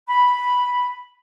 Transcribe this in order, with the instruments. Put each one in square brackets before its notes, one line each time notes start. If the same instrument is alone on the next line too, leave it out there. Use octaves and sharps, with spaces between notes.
[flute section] B5